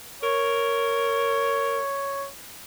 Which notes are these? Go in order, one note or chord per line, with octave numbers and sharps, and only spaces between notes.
A#4 C#5